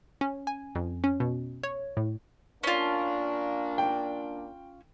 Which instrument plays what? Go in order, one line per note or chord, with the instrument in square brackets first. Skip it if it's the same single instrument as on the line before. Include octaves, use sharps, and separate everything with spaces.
[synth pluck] C#4
G#5
F2
C#4
B2
C#5
A2
[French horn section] A#2 A#3 D4 [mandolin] C#4 F4
[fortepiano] G5